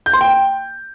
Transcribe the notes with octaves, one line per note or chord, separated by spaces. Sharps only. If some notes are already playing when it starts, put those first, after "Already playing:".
G6
C6
G5